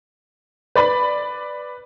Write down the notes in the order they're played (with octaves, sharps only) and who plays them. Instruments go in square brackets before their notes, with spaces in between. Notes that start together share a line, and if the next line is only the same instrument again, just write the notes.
[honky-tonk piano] B4 D5 B5